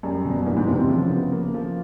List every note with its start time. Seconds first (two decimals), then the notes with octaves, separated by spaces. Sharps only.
0.03 F#2 G3
0.25 B2
0.38 F#2
0.46 G2 E3
0.56 G#2
0.68 C3 C4
0.78 C3
0.89 C#3 F3
1.10 B3
1.32 A#3
1.54 F3